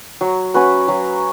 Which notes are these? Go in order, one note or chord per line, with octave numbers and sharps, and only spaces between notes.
F#3
C#4 F#4 B4
F#3